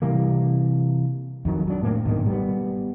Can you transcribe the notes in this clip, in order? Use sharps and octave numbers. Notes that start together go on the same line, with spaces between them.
C3 E3 G3 A#3
F2 D#3 F#3
F#3 D4
A2 A#3 C4
G#2 B2 D#3
G3 G#3 B3